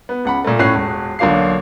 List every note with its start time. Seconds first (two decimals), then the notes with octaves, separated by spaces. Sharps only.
0.09 B3
0.25 C#2 F#5 B5
0.45 A#2 A3
0.59 A2 A3 C#4 F#6 C7
0.75 E1
1.19 B1 D3 A#3 F5 C7